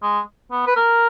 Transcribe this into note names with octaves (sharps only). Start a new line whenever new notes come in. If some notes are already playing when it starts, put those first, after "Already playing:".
G#3
B3
B4
A#4